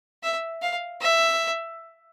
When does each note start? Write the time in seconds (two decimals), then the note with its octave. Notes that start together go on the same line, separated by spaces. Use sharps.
0.23 E5
0.62 F5
1.01 E5